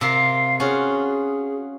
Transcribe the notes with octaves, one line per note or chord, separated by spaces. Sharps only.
C3 F4 A#4 F5
C#4 F4 F#4 G#4